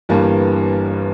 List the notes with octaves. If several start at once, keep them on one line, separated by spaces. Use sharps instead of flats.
G1 G2 E3 G3 A#3